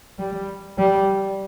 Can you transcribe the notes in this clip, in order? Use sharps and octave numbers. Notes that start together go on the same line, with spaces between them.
G3
G3